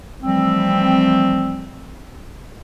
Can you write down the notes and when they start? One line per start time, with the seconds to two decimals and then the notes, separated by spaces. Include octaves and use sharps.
0.23 E3 F3 G3 A3 C4